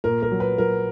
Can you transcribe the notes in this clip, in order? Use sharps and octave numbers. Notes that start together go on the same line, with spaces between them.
A#2 A#4
A#4
F#3
B4
F#3 A#4